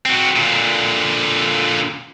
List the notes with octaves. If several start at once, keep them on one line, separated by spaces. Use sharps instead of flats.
C4 F#4
A#2 D3